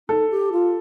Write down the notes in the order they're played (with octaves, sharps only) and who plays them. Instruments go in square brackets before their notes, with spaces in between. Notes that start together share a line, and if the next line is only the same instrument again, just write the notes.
[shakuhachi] D#4 [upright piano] A4
[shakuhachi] G4
F4